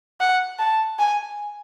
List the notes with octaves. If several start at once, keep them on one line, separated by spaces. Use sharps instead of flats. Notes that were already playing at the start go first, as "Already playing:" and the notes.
F#5
A5
G#5